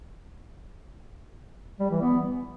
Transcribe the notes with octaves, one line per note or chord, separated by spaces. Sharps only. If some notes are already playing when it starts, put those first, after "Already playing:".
G3
E3
B3